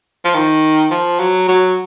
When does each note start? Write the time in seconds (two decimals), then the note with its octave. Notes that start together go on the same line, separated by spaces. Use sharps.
0.25 F3
0.35 D#3
0.91 F3
1.20 F#3
1.48 F#3